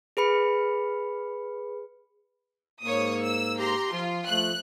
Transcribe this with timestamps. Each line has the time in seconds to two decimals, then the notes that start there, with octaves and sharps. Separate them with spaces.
0.17 G#4 B4 B5 C#7
2.83 G#2 A#3 C#5 D#6
3.23 E6
3.59 G4 A#5 C6
3.93 F3 F4
4.27 F3 A3 F#6